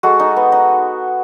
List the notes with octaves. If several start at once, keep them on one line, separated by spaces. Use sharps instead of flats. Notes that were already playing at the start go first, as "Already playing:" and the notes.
G#3 F#4 A4
D#4
B3
D#4